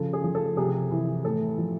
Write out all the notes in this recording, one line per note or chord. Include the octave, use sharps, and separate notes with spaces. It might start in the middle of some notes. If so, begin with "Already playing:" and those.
Already playing: C#3 F3 A4
G#4
F3
A4
C3 G#4
E3
A2 A4
F3